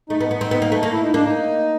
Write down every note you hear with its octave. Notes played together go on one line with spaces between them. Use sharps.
A3 D#4
B3
B3 D#4
C4
B3
A#3
A3
A#3
E4
D#4
A#3 D4
D#4